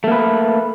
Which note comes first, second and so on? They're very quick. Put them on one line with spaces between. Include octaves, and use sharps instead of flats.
A3 A#3 B4